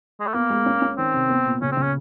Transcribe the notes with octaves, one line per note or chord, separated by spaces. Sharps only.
G#3
A3
A#3 B3
G#3
C#4
C#4
D#3 C4
C3
B3
A#2
C#3 C#4
C4
C#3
C#4